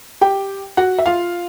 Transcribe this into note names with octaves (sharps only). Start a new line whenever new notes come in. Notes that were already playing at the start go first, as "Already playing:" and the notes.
G4 G5
F#4 F#5
E5
F4 F5